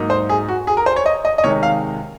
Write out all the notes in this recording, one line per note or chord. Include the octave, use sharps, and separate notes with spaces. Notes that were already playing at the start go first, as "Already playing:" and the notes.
Already playing: G#2 F#3 A#3 D#4
C5
G#4
F#4
G#4
A#4
C5
C#5
D#5
D#5
D#5
C3 D#3 G#3 C#5
F5